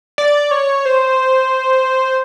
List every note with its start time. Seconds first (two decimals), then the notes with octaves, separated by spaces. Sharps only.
0.18 D5
0.51 C#5
0.86 C5